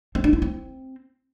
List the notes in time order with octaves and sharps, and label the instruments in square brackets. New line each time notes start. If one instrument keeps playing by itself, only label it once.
[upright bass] C4
D4
E4
C4